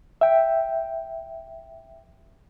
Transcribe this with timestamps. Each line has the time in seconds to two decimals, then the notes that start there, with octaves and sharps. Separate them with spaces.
0.21 E5 G5